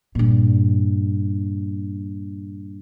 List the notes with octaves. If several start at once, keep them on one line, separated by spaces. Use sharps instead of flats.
G2 A#2